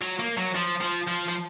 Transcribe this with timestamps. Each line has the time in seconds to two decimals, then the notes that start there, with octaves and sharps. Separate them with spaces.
0.02 F#3
0.20 A#3
0.37 F#3
0.55 F3
0.81 F3
1.08 F3
1.29 F3